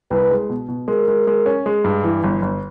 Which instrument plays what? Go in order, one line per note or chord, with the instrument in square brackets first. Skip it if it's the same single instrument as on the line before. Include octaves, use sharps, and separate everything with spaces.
[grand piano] C2 [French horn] B4
[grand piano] G#3
B2
B2
[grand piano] G#3 [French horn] A#4
[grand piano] G#3
G#3
C#4
G#3
G2
E3
G1
G1